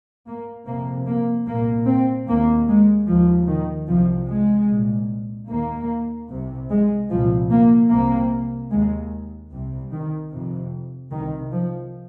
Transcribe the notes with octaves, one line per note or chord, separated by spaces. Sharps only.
A#3
F2 C3 A#3
A#3
C2 A#2 A#3
C4
D#2 A#3
G#3
D#2 F3
D#3
C2 C3 F3
G#3
C2 A#2
D#2 A#3
C2 C3
G#3
C2 A#2 F3
A#3
C2 C3 A#3
D#2 G#3
C2 C3
D#3
F2 C3
C2 C3 D#3
F3